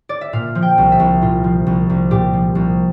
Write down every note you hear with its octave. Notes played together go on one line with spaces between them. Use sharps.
D5
E5
A#2 F5
F3
G5
C2
E5
C2
A#2 F4
F3
C2
C2
A#2 G4
F3
C2